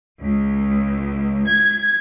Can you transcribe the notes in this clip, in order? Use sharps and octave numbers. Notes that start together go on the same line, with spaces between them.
C#2
G#6